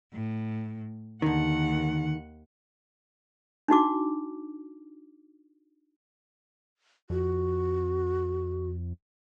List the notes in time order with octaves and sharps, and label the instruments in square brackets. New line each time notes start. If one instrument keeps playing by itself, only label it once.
[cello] A2
[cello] D#2 F#5 [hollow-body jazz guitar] D3 D#3
[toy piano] D4 D#4 F#4 D6
[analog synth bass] F2 [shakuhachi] F#4